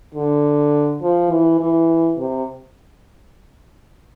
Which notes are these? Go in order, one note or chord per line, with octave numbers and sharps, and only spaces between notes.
D3
F3
E3
E3
C3